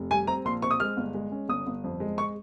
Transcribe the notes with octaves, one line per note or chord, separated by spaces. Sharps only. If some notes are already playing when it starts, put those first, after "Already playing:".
Already playing: F1
G3 G#5
C4 A#5
A#1 C6
C4 C#6
D#6
G#3 F6
G1
G#3
C#4
G1 D#6
G1
F2
G#3
C#6